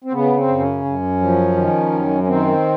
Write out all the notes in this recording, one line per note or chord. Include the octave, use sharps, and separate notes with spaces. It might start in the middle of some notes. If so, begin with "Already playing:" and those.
C4
C#3 B3
C4
F#2
C#4
F#2
F3
D#3
F#2
C#4
D#3 C4